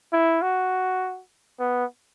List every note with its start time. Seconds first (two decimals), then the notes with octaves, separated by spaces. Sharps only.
0.13 E4
0.42 F#4
1.59 B3